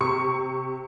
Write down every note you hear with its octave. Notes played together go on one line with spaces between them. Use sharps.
C3 C#6 C#7